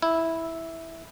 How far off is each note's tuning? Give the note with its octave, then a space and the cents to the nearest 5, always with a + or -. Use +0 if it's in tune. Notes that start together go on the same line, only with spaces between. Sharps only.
E4 -5